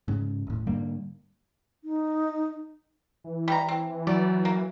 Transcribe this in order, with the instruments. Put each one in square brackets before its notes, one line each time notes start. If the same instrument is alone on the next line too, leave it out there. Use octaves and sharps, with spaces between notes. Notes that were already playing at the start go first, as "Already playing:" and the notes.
[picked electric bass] G#2 C#3
D#1 A2
G#2 D3 G3 A#3
[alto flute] D#4
[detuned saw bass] E3
[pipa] G3 A#5
C4
[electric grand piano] F#3 [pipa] D5
[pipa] A#3